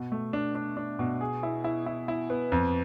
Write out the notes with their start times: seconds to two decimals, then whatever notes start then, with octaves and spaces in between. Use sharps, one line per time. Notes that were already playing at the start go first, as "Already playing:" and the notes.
Already playing: B2
0.12 A3
0.33 D4
0.55 D4
0.77 D4
0.99 B2
1.21 G#4
1.43 E4
1.64 E4
1.86 E4
2.08 E4
2.30 B3
2.52 F2